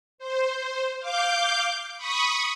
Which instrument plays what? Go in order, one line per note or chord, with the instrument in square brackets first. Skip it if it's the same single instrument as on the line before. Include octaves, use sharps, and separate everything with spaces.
[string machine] C5
F5 D6 G6
B5 C#6 D#6